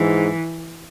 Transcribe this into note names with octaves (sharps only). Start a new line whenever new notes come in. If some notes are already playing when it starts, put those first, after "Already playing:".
Already playing: G#2 E3